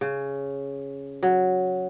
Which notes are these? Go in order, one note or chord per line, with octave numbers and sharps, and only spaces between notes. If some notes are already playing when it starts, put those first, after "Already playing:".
C#3
F#3